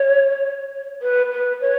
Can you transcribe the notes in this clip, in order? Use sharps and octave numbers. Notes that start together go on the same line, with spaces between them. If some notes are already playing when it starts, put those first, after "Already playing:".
Already playing: C#5
B4
B4
C#5